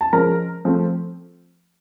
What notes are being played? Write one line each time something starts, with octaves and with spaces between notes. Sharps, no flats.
A5
F3 G#3 C#4 A#4 A#5
F3 A3 C4